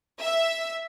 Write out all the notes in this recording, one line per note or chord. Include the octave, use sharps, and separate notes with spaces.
E5